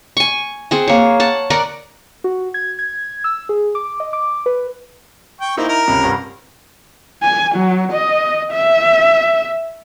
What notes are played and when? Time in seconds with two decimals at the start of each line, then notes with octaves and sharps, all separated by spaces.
0.17 G#5 C#6
0.71 C4 G#4 F#5
0.88 A#3 C#5
1.20 F#5 A5
1.50 A#4 D5 F#5 A#5
2.24 F#4
2.54 G#6
2.79 G#6
3.24 E6
3.49 G#4
3.75 D6
4.00 D#5
4.13 D6
4.46 B4
5.41 G5 C#6
5.57 A#3 C4 D#4 E4
5.69 A#4 A#5
5.88 C#2 C3
6.04 C2 G2
7.23 G#5
7.55 F#3
7.93 D#5
8.52 E5